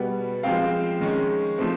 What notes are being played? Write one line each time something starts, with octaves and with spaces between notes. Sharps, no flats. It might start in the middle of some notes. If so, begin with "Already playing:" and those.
Already playing: B2 G3 B3
F3 G#3 C4 F5 G5
D#3 G#3 C#4
F3 A3 C4